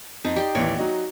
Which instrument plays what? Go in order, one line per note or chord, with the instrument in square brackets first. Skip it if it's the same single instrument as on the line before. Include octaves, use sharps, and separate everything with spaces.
[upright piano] F2 [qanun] D#4
[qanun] G4 G5 C6 [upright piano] D5
[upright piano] A1 D#2 E3 [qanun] C#5 D5
[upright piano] F#3 D#4 F#4